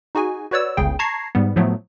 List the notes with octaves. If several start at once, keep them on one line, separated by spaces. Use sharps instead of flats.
D#4 F#4 G#4 G#5
F#4 B4 C#5 D5 E6
G1 C#2 C#3 G#4 G5
A5 A#5 C#6 G#6 A#6 C7
G#2 G3 B3
A2 F3 F#3 A3 B3